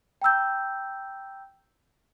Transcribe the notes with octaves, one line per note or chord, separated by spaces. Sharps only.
G5 A#5 E6 G6